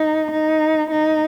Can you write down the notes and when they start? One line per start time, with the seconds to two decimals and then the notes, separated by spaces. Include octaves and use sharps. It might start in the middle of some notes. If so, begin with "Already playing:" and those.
Already playing: D#4
0.31 D#4
0.91 D#4